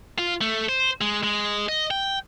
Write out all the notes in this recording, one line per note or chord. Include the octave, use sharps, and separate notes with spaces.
F4
A3
C5
G#3
G#3
D#5
G5